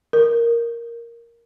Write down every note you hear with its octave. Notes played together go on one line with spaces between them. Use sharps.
A#4